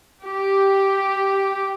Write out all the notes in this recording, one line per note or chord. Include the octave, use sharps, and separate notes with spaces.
G4